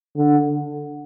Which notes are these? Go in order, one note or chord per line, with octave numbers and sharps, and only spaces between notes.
D3